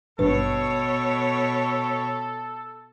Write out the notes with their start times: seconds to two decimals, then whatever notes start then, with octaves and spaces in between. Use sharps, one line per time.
0.19 G#1 G2 B2 A4 B4 C#5